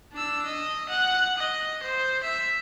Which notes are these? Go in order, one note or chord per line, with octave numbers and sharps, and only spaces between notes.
D4 E6
D#5
F#5
D#5
C5
E5